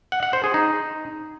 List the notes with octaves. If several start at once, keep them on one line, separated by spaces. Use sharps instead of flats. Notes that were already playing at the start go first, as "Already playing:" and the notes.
F#5
F#5
C5
G#4
D#4